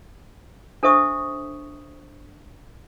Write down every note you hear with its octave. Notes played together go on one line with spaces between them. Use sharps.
D4 A4 C5 E5 C#6 D#6